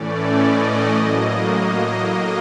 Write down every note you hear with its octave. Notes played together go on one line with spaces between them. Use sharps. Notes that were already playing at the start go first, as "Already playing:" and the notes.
Already playing: A2 E3 A3 C#4 D5
D#5
A2 F#3 A#3